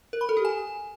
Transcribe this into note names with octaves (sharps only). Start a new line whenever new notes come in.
A#4
B5
A4
G4
G#5